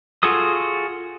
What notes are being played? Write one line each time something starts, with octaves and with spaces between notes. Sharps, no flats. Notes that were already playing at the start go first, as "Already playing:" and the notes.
F4 F#4 G#4 A4 D#6